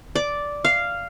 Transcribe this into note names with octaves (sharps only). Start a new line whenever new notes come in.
D5
F5